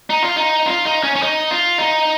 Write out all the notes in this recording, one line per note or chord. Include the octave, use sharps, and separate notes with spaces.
D#4
F4
D#4
F4
D#4
C#4
C#4
D#4
F4
D#4